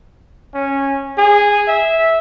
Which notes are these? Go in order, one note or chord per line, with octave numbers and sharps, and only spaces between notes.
C#4
G#4
E5